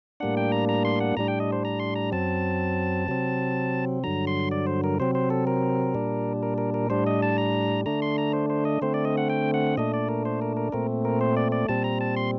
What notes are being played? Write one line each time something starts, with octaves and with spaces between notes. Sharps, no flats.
A2 G3 A#3 D4 F#5
G5
A#5
A#5
C6
F#5
A2 G3 D4 A#5
G5
D#5
C5
A#5
C6
A#5
F#2 F#3 C4 A5
C3 F#3 C4
G2 D3 F#3 A#5
C6
D5
C5
A#4
C3 F#3 C4 C5
C5
A4
A#4
A#2 G3 D4
A#4
A#4
A#4
A2 G3 D4 C5
D#5
A5
A#5
D3 A3 D4 A#5
C6
A#5
C5
C5
D#5
D3 A3 C4 C5
D5
D#5
F#5
G5
F#5
A#2 A3 D4 D#5
D5
A#4
C5
A#4
A#4
A#2 A3 C4 A#4
A#4
C5
D5
D5
A#2 G3 C4 A5
A#5
A5
C6